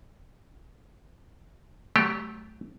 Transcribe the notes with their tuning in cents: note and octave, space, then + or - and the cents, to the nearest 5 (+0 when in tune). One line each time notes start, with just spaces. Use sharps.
F#3 +25 A3 -20 G4 +0